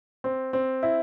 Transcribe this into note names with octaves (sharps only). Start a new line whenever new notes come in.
C4
C4
E4